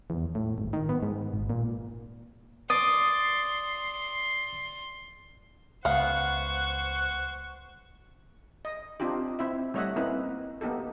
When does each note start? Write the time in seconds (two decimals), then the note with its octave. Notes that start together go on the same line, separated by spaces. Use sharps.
0.10 E2
0.35 A2
0.58 G#1
0.73 D#3
0.89 B3
1.03 G#2
1.34 G#1
1.50 A#2
2.70 D5 C6 D#6
5.85 C#2 B3 C5 F5 F#5 C#6
8.65 D#5
9.00 C4 D4 D#4 F4 G4
9.39 C4 E4 E5
9.74 G3 A3 C#5 D#5 E5 F#5
9.96 A#3 C4 C#4 D#4 E4 B4
10.61 A#3 B3 D#4 G4 A4